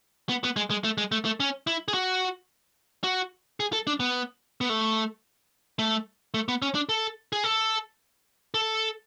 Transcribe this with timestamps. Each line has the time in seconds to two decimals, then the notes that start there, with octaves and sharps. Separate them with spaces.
0.29 B3
0.44 B3
0.56 G#3
0.71 G#3
0.84 A3
0.98 G#3
1.12 A3
1.25 A3
1.40 C#4
1.67 E4
1.88 G#4
1.94 F#4
3.04 F#4
3.60 G#4
3.73 A4
3.87 D4
4.00 B3
4.61 B3
4.69 A3
5.79 A3
6.34 A3
6.48 B3
6.62 C#4
6.75 D4
6.89 A4
7.33 G#4
7.44 A4
8.54 A4